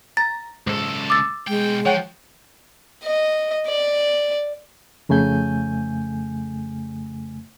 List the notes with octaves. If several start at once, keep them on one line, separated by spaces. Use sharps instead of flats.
A#5 A6
C#2 G#2 A4
D6 E6 A6
B1 G#3 G5
F3 C#5 F#5 G5
D#5
D5
F2 C#3 A3 G#5 G6